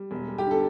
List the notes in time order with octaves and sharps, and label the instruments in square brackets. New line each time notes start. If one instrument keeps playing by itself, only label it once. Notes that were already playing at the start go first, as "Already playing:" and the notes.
Already playing: [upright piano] G3
E1
G3
G4
D3 A4